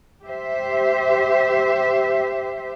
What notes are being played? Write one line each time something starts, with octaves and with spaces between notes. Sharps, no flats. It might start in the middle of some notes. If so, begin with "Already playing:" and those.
G4 C5 E5